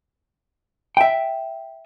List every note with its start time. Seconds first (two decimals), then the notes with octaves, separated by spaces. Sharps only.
0.97 E5 G5